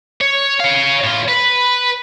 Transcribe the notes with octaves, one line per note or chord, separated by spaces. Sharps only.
C#5
C#5 F5
A2 F4
B4